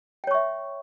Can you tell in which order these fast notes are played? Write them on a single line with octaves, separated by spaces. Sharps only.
G5 C#5 C#6 E5